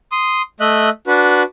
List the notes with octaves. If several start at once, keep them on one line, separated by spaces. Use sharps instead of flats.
C6 D#6
A3 D#5 E5 F#6
D4 F#4 B4